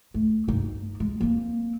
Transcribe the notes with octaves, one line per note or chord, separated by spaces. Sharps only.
A3
G2 D#4
G#3
A#3 C4